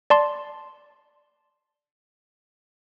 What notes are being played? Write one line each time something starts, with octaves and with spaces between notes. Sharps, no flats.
D5 A5 C6